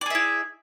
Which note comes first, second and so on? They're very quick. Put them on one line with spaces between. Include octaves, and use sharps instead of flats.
D5 G#4 E5 E4